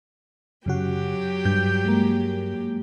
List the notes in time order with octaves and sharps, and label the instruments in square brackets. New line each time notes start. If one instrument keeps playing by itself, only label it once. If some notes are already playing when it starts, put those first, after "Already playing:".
[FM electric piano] F#2 C#3 F#4 [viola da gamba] F#3 G4
[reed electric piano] G2 [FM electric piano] G6
[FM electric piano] G#3 A#3